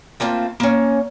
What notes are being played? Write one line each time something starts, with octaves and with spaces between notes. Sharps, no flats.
A3 A#3 C4 F4
A#3 C#4